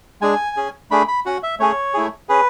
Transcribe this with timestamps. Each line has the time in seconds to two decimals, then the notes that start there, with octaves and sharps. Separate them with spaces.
0.22 G#3 D4 G#4 G#5
0.57 C#4 G#4
0.91 A3 D4 G#4 B5
1.08 B5
1.26 C#4 F#4 F#5
1.43 E5
1.59 A3 C#4 G#4 C#5
1.94 A3 E4 G#4
2.29 C#4 G#4 B4